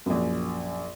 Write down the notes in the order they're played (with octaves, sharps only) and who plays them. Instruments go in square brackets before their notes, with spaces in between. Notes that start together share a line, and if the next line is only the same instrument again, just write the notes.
[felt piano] A#1 F#2